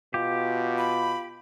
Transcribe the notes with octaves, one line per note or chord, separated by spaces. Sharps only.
B2 F4 G4
B5